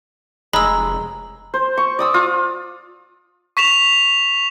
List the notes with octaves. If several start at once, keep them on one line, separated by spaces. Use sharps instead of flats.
F1 G#3 A#5 B5 E6
C5
C#6
D5 D#6 E6
F4
C#6 B6 E7 F7